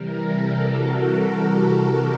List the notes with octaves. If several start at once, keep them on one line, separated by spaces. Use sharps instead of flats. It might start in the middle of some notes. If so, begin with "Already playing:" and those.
Already playing: C3 E3 G3 A#4
A4
F#4